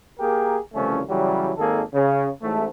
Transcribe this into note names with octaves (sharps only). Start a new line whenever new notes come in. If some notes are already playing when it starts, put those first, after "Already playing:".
A#3 G4 G#4 A#4
C2 C#3 E3 F3 A3 C#4
C#3 E3 F#3 G3
G#1 D#3 A#3 G#4 A4
C#3
A1 G#2 A3